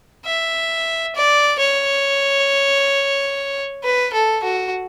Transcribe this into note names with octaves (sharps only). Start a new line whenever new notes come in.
E5
D5
C#5
B4
A4
F#4